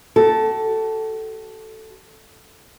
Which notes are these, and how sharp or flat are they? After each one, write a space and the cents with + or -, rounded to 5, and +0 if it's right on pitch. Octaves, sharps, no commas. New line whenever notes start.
F#4 +45 A4 +0